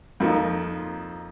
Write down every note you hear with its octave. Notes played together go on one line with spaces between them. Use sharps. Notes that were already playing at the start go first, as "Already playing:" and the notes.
F2 F3 A#3 D#4